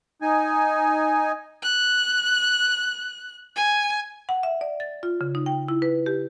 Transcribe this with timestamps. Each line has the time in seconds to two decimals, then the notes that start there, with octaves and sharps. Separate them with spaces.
0.22 D#4 G#5
1.63 F#6
3.56 G#5
4.29 F#5
4.43 E5
4.61 D5
4.80 A6
5.03 F4
5.21 C#3
5.35 D#4
5.46 G5
5.68 E4
5.82 B4
6.06 G4